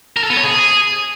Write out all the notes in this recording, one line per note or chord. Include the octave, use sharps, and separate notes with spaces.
A#4
A4
B3
C#5
G#4